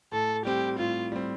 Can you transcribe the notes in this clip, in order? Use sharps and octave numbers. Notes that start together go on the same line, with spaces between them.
A2 A4
G3 C4 G4
A2 F4
G3 C4